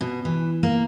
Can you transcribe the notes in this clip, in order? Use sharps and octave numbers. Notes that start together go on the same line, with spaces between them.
B2
E3
A#3